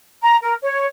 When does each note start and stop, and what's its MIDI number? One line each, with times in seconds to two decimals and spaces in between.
0.21 0.36 82
0.42 0.54 70
0.62 0.85 73